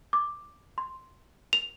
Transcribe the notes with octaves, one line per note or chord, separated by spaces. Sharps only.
D6
C6
F7